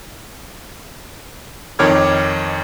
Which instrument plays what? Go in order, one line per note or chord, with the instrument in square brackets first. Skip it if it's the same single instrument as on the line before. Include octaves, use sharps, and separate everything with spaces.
[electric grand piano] F2 D#3 C#5 D6 F6 G#6